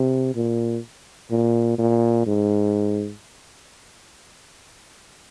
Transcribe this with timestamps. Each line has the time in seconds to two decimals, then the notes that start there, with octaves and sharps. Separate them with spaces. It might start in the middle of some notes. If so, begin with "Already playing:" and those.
Already playing: C3
0.35 A#2
1.31 A#2
1.78 A#2
2.26 G#2